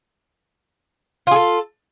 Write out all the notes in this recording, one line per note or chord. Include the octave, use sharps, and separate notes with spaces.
F4 G#4 A4